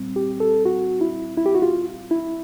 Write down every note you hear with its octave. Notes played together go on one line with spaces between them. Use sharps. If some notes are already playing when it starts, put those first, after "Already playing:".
Already playing: A#2 G3 C4
G4
A4
F#4
E4
E4
G4
F#4
F4
E4